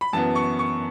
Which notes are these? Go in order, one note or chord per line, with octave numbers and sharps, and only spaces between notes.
B5
F#2 E3 B3 A5
C#6
C#6